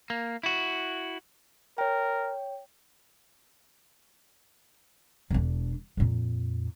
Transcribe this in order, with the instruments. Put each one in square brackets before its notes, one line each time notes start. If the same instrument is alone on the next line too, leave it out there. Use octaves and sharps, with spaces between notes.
[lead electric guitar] A#3
E4 F#4
[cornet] A#4 [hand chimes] C#5 G5
[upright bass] E1 D4
F2 A#2